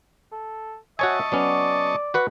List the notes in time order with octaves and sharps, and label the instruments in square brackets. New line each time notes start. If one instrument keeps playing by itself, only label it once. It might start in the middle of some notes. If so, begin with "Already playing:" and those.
[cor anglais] A4
[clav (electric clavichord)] F#4 C#5 G#5 [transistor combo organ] D#5 A5 C#6 [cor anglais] E5
[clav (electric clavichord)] F#3 B3 C#4 [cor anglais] D5
[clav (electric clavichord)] F#4 B4 F#5